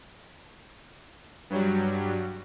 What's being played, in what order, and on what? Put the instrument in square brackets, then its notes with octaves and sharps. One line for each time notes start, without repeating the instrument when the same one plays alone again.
[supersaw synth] G2 F#3 G3